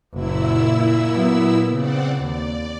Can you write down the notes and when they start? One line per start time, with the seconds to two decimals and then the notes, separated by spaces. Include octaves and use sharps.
0.14 F#1 A#2 F#3 E4 E6
1.12 F#3 B3
1.73 C#3 C4 D5 F#5
2.22 D#2 D5